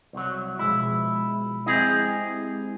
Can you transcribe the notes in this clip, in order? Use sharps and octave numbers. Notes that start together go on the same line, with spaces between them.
C2 F#3
B2 F3 G#3 E4
G#3 C4 E4 G4 G#4 D#5